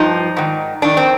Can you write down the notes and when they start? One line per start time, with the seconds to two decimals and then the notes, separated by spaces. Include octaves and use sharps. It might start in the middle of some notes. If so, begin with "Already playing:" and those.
Already playing: G2 F3 D#4
0.37 G#2 D#3
0.82 F2 D#3 D4
0.97 C4